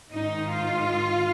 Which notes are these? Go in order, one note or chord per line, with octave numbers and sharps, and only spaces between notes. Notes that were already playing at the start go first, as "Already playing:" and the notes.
G#2 D#3 D#4
F4